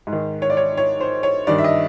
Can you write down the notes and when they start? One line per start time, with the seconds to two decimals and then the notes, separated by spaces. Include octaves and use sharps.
0.07 G#2
0.12 D#3
0.42 C#5
0.50 D5
0.57 C#5
0.77 C#5
1.00 C5
1.23 C#5
1.47 G2 D#3 D5
1.58 E5
1.64 D#5